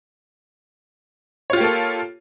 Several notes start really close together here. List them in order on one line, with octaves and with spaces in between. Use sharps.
C#5 F4 G4 A#3 A4